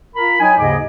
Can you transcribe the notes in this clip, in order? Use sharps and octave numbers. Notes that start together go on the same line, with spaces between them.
F4 A#4 A#5 B5
F#3 D#4 G5 G#5
D#2 G#2 C#3 G#4 D#5 D6